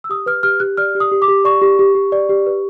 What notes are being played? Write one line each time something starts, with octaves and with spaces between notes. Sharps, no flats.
E6
G4 D#6
B4 F6
G4 F6
G4 F#6
D5 F6
G4
D#6
G4
D6
G4
D5 C#6
G4
G4
G4
D5
G4
B4